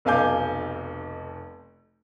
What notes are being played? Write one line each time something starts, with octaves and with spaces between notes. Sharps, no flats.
F1 B1 F5 G#5 D6 G6